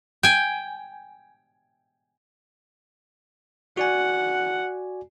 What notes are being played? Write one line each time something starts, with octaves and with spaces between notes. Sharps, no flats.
G5 G#5
F#4 D5 F#5 G#5